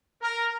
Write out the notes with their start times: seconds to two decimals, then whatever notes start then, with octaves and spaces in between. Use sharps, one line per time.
0.22 A#4